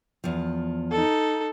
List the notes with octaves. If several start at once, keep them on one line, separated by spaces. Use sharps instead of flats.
E2 F3
D#4 A4